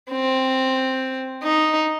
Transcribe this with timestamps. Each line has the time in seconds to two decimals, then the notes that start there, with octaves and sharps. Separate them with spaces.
0.11 C4
1.43 D#4